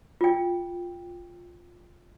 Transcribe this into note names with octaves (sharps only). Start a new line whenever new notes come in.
F4 G5